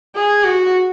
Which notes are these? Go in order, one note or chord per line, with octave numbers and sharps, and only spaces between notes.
G#4
F#4